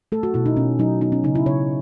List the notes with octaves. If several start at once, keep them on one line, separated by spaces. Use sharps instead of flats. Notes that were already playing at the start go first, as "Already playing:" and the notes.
A3 A4
F#4
B2 E4
D#4
B2 C#4
F#3 D#4
B3 D#4
C#4
C#3 D#4
E4
C#3 C#5